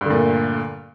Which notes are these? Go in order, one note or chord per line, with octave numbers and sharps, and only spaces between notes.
G2 A#2 D3 A3